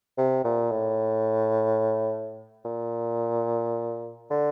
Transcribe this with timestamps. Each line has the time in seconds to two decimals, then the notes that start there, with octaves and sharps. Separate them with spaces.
0.18 C3
0.44 A#2
0.72 A2
2.65 A#2
4.30 D3